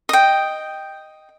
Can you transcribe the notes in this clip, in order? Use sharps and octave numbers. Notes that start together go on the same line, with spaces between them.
D#5 G5